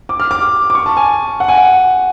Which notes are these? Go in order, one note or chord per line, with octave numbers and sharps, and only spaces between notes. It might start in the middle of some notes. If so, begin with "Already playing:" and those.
D6
F6
D6
D6
C#6
A5
G#5
F#5
G#5
F#5